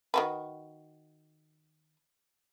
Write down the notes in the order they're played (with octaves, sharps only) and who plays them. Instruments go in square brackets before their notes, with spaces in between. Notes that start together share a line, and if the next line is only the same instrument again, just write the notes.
[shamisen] D#3 F#4 B4